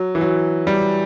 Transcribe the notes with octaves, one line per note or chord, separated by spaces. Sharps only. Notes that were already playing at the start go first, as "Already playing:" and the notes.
Already playing: F#3
E3
F#3
G3